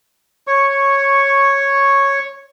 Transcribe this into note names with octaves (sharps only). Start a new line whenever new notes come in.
C#5 C#6